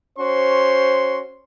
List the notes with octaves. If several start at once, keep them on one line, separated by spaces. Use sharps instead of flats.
C#4 F#4 C5 C6